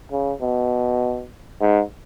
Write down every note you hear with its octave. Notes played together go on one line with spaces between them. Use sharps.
C#3
B2
G#2